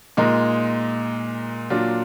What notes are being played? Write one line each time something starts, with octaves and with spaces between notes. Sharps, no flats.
A#2 G#3 D#4 A#4
A#2 F#3 D4 F4